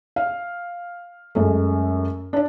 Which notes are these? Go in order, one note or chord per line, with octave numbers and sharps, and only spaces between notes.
F5
F#2 G#3 A3
D4 D5